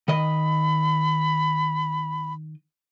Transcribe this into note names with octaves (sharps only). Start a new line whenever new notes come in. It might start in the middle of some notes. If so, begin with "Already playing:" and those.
D#3 D#5 B5